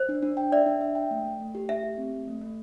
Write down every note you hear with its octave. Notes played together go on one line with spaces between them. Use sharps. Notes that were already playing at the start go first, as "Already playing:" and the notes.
Already playing: C5
D4
D4
G5
D5 E5
D4
E5
G5
A3
A3
A3
G4
A3 E5
G4
C4
A3
A3
A3